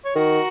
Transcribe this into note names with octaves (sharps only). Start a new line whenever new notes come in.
C#5
D#3 F#4 A#4